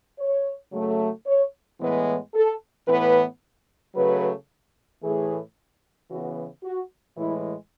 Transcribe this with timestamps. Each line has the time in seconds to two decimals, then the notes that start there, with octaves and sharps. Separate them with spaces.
0.19 C#5
0.72 C#3 F#3 A3
1.26 C#5
1.80 A2 E3 G#3 B3 B4
2.34 A4
2.87 A2 E3 B3 B4
3.95 C#3 F#3 A3 B4
5.02 A2 E3 A3 G#4
6.10 C#3 E3 B3 F#4
6.63 F#4
7.16 A2 E3 G#3 E4